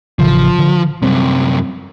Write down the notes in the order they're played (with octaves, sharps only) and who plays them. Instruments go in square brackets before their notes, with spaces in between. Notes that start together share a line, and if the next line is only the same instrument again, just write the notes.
[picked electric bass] A1 C#3 E3 [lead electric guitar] F3
[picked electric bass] D3
[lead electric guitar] F#2 C3 [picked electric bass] F#3 G3 C4